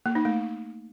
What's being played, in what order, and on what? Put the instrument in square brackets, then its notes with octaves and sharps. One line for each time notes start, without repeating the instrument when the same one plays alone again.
[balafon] A#3
D#4
A3